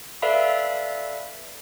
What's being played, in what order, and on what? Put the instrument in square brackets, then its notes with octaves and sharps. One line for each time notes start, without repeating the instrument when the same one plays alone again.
[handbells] A4 B4 D5 E5 F5 B5